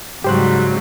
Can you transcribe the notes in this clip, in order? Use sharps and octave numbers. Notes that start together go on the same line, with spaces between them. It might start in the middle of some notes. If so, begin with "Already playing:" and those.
G#2 C#3 F#3 G3 G4 C5 F#6